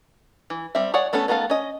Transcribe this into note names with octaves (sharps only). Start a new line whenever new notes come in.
E3
G3 C4 E5
G#4 C#5 D5 F#5
A3 B3 C#4 A4
D#3 A3 B3 A4 F5
C#4 D#5